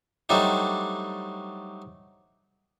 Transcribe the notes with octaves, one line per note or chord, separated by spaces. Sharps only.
F#3 G3 A3 C4 D4 D#4